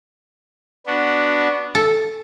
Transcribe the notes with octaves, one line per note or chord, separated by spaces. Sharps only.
B3 D4 F#4
A4